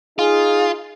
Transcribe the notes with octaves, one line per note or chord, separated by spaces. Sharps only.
D#4 F4 G#4